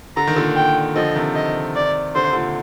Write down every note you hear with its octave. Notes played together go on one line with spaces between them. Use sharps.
D3 A#5
D#3
A#2 D3
G5
D3 F3 D#5
C3 D#3
D#5
D5
D3 C5
C3
A#2 D3